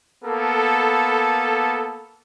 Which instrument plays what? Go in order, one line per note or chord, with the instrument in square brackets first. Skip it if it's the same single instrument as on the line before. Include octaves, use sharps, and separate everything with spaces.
[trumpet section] A#3 B3 A4